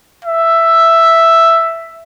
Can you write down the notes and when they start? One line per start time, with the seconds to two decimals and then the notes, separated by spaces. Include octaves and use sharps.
0.25 E5